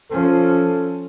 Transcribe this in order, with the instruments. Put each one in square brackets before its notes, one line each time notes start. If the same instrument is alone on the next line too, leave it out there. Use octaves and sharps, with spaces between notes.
[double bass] F3 C#4 [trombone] A4